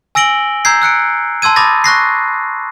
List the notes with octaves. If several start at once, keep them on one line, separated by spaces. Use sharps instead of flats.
G#5 E6 A#6 D7 F#7 G7
A#5 E6 G6 G#6 C7
E6 F#6 C#7 D7
A5 C6 E6 G#6 D#7
B5 D6 D#6 A6 A#6
C#6 F#6 A#6 C7